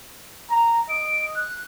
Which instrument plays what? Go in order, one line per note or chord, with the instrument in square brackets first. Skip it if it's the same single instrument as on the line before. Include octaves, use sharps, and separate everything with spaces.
[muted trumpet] A#5
[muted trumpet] D#5 [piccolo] D7
[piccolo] F#6